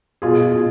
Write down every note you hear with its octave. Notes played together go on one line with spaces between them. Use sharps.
B2 F4 G#4
B2